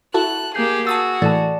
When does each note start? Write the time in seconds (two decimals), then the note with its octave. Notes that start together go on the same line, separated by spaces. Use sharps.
0.14 E4 F#4 A4 A5 F#6
0.55 A#3 G4 G#4 G6 C7
0.87 F#4 G#4 A5 D#6 E6 A6
1.22 A2 E3 A4 D5 A5